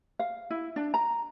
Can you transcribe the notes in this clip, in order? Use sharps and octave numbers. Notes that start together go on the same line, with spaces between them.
F5
E4
D4
A#5